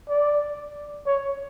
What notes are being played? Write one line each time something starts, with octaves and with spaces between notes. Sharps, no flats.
D5
C#5